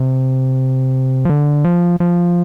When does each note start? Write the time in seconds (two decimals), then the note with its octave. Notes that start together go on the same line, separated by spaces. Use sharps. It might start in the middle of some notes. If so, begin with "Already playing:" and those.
Already playing: C3
1.25 F3
1.30 D3
1.64 F3
2.00 F3